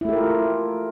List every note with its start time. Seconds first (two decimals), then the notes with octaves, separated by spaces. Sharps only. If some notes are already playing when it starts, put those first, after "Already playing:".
0.01 E4
0.05 A3
0.09 G4
0.12 A#4
0.16 F4